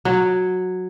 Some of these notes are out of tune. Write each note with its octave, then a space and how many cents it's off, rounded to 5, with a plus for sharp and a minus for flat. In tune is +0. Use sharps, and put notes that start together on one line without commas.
F#3 -10